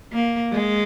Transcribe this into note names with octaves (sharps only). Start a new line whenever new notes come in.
A#3
G#3